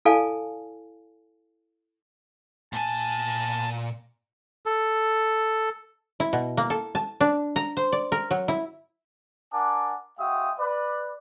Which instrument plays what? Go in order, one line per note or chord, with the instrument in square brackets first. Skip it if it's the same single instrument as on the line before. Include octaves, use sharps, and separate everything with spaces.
[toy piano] E4 A4 D5 F5 G#5 A5
[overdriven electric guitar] A#2 G#5 [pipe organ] A5
[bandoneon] A4
[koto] E4
B2
A#3
A4
A5
D4
A#5
C5
D5
A#4
F#3
E4
[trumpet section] D4 A#4 F#5 G#5 A5 D6
G#3 F#4 E5 F5 G5 D#6
B4 D5